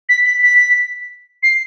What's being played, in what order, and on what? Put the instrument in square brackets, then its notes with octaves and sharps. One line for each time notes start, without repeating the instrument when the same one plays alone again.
[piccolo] B6
B6
B6
C7